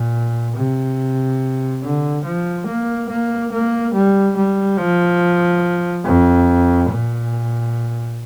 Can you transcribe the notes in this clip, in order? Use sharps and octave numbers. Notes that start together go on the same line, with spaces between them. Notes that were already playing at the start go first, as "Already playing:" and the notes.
Already playing: A#2
C3
D3
F3
A#3
A#3
A#3
G3
G3
F3
F2
A#2